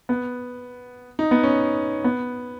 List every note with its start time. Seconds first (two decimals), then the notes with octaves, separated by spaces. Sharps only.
0.09 B3
1.19 D#4
1.31 B3
1.43 C#4
2.04 B3